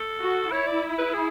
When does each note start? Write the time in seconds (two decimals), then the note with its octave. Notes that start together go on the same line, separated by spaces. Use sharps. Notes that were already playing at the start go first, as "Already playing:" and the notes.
Already playing: A4
0.21 F#4
0.52 E4 C#5
0.67 D5
0.98 B4
1.14 G#4